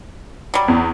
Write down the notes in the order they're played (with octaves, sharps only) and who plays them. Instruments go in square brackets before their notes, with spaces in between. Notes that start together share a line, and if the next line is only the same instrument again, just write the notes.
[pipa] F#3 G3
[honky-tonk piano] E2